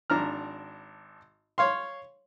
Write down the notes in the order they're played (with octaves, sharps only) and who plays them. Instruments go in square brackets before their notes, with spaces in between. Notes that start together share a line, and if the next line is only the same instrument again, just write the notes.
[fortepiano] G#1 D4 A#5 F6
C#5 F5 C6